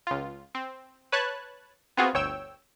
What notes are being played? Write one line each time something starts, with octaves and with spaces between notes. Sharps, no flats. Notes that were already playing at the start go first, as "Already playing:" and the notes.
C#2 F4
C4
B4 C#5 A5 F#6 G#6
B3 C4 F4 F#4 G#4
G1 D2 C#5 G5 E6